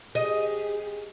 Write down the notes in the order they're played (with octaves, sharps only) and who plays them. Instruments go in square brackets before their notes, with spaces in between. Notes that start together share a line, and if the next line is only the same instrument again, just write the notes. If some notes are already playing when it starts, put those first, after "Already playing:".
[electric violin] G4 G#4 [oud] D#5